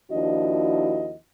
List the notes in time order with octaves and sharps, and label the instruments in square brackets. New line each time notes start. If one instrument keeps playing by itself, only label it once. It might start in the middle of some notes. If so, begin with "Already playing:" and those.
[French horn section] D#2 F3 D4 E4 F#4 D#5